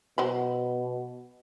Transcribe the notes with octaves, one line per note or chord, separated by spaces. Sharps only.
B2 F#3 C5 B5